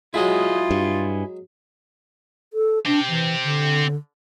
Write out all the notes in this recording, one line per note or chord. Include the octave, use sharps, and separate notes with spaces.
F#3 G#3 E4 F4 G#4 D#5
G2
A4
C4 D4 G4
E3
D3